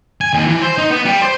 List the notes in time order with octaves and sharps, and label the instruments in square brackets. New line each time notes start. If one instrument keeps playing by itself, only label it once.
[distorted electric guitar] G#5
D#2
E3
C5
D#4
B3
G3
C5